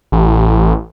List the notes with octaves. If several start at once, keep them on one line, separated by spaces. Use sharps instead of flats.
A1